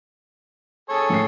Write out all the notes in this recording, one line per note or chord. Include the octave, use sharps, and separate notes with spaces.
G#4 A4 C#5
A2 C7